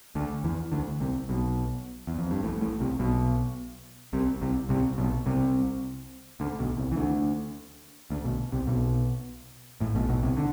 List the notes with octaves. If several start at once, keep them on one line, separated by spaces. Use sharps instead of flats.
D2 D3
E2 E3
D2 D3
C2 C3
B1 B2
E2
F2
G2
A1 A2
A1 A2
C2 C3
B1 B2
C2 C3
C2 C3
C2 C3
B1 B2
C2 C3
D2 D3
B1 B2
C2 C3
E3
D2 D3
D2 D3
B1 B2
C2 C3
B1 B2
A1 A2
B1 B2
B1 B2
C2 C3
D3